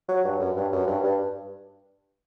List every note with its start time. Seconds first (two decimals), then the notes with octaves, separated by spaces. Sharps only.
0.09 F#3
0.25 G2
0.40 F#2
0.56 G2
0.72 F#2
0.87 G2
1.04 G2